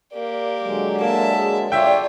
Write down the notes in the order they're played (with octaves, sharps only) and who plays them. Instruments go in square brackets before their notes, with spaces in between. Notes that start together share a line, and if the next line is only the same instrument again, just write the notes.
[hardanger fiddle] A#3 G4 [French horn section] A#4 D5
[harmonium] D3 F#3 G#3
[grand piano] A#3 [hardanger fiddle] E5 A5
[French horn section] G#4
[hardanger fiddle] F4 C#5 [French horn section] D5 [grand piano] E5 G5